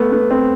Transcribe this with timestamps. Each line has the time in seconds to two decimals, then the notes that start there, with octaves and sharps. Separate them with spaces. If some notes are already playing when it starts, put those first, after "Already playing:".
Already playing: A3 B3
0.12 B3
0.31 C4